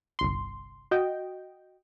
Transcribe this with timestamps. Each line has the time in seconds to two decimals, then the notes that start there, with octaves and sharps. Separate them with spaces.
0.19 G1 C2 C6
0.91 F#4 D#5 G5